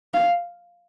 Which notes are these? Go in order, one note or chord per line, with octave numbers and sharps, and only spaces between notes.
F5